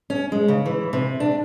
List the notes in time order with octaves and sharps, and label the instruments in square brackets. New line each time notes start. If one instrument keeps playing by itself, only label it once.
[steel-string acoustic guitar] C#4
G#3
C#3
E3
C3
D4